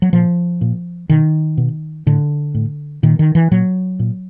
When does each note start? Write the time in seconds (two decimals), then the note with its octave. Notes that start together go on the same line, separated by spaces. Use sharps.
0.02 F#3
0.13 A#2 F3
0.61 A#2
1.10 B2 D#3
1.58 B2
2.06 A2 D3
2.55 A2
3.03 A#2 D#3
3.19 D#3
3.35 E3
3.51 A#2 F#3
3.99 A#2